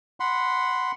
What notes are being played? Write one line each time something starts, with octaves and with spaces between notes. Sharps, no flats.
F#5 B5 C6